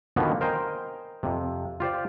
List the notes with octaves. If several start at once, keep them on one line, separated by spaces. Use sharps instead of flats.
B2 D3 D#3 F3 A#3 B3
A#4 C5 D#5 G5 G#5 A#5
F2 C3
F4 G4 C5 D5